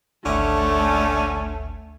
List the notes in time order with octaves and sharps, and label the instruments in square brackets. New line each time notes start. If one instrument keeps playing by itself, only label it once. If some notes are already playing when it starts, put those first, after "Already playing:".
[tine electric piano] G#1 D2 E5 [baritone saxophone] D3 [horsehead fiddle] A3 [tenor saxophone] C#4